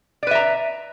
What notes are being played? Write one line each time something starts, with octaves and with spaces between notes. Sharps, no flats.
B4 D5 E5 A#5